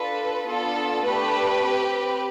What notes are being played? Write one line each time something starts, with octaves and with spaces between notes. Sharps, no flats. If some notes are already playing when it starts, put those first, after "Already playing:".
Already playing: D4 F4 A4 B4
B3 D4 F4 A4
A3 D4 G4 B4
C4 G4